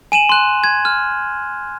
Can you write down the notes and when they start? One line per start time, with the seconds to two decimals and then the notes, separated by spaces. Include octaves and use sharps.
0.12 G#5 D#7 E7 F#7
0.29 C6 F#6
0.64 G#6
0.85 F6